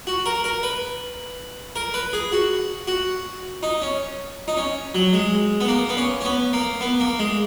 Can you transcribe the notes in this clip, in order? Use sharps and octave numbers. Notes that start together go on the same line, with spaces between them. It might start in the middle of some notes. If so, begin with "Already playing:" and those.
F#4
A#4
A#4
B4
A#4
B4
G#4
F#4
F#4
D#4
C#4
D#4
C#4
F#3
G#3
B3
A#3
B3
C#4
C#4
B3
A#3
B3
A#3
G#3